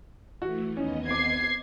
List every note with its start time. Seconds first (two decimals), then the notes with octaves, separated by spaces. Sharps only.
0.42 E3 A3 F#4
0.77 D#2 B3 C#4 D#4 D#5
1.07 C4 D6 G#6 C7